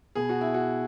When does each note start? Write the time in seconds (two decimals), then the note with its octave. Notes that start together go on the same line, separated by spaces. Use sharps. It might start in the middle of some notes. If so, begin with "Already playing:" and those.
0.15 B2 G#4
0.29 F#4
0.41 E4
0.54 F#4